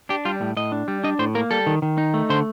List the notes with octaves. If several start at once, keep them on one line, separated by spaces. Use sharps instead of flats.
D4 G4
G3 F4
A2
A2 D#5
D4
G3
D4 D#5
A2 C5
A#3 A#4
G3 A4
D#3
D#3
D#4
A3
D3 C5